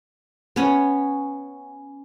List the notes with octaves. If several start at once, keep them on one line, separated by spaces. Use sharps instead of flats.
B3 C#4 F#5